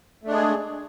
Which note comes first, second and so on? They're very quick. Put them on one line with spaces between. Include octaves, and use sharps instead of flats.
A3 D4 G#3 G#4